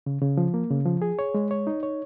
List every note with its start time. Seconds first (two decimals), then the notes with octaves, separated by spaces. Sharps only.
0.06 C#3
0.22 C#3
0.37 F3
0.54 A#3
0.71 C#3
0.86 F3
1.02 G#4
1.19 C#5
1.34 G#3
1.51 C#5
1.67 D#4
1.83 C#5